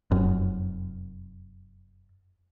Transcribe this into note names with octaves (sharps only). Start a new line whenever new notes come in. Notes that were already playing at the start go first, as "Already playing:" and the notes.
F1 F#2